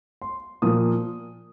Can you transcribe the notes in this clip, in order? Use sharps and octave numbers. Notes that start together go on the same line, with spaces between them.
C6
A#2 F3 A#3 D#6